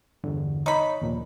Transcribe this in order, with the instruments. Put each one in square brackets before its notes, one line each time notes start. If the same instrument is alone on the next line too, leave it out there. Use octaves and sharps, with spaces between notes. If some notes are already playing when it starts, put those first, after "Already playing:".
[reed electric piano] E2 G2 D3
[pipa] D#4 B5 [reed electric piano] C#5 D#5 A#5
[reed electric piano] D#2 A#2 F3